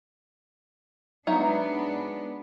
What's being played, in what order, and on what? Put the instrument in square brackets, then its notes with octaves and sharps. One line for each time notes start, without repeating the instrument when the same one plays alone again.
[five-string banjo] F#3 D#4 E5 [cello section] G#3 B3 D4